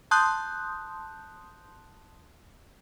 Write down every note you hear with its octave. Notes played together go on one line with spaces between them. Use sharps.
A5 C6 D#6 F#6 G6